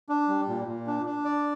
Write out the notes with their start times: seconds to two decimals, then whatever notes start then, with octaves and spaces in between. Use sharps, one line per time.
0.09 D4
0.28 G3
0.48 A#2
0.67 A#2
0.87 D4
1.06 D4
1.25 D5